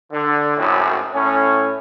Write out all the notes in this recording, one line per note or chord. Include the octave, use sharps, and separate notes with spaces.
D3
G#1 F#2 A2
A2 C#4